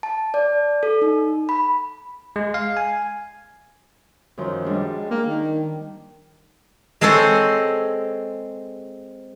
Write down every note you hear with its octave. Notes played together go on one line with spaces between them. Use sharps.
A5
D5
A4
D#4
B5
G#3
F5
G#5
F#2 D#3 F3
G3 G#3 D4
A#3
D#3
G#3 C4 A4 C5 C#5